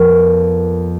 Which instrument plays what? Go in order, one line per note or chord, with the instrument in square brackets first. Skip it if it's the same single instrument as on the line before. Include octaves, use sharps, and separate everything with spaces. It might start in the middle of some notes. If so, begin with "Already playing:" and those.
Already playing: [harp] F2 F3 B3 A#4